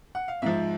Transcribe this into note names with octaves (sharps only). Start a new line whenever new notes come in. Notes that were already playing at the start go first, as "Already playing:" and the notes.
F#5
F5
G#2 F3 E5